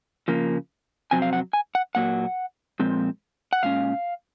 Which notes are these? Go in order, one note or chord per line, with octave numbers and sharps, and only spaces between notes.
C#3 F3 A#3
F2 C3 F#3 C4 G#5
F5
F#5
G#5
F#5
A#2 F#3 A#3 F#5
A#2 F3 G#3 C4
F#5
A#2 G#3 C#4 F5